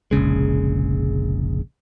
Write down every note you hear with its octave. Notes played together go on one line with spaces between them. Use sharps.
F1 A#1 C#3 G#3